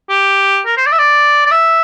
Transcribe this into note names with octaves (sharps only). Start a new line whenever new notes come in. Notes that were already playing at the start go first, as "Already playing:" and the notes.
G4
A#4
C5
D5
E5
D5
D5
E5